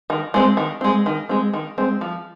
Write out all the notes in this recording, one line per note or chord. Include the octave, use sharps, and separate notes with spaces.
D#3
G#3 C4
D#3
G#3 C4
D#3
G#3 C4
D#3
G#3 C4
F3